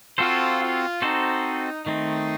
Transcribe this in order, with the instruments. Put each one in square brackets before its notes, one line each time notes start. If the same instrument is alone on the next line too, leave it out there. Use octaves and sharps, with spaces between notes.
[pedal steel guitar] C4 F#4 A4 C5 [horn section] F4
[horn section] F4
[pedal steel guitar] C4 F#4 A4 C5 [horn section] D#4
[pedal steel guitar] D#3 A3 C4 [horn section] D#4